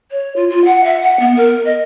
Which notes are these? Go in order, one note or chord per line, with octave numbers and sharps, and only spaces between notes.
C#5
F4
F4
F#5
E5
F#5
B3
A#4
D#5